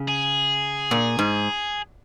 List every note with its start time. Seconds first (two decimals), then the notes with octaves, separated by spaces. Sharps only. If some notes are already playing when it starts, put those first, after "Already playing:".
Already playing: C#3
0.08 G#4
0.91 A#2
1.19 G#2